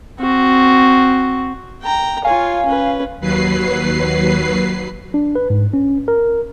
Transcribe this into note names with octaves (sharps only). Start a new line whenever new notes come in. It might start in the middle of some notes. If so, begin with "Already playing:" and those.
C4 F#4
G5 A#5
F4 C#5 F5 G#5
C#4 B4
D#2 F#3 B4 C7
D4
B4
G#2
C#4
A#4